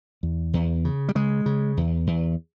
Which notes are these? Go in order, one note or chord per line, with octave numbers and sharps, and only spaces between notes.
E2
E2
C#3
G3
C#3 G#3
C#3
E2
E2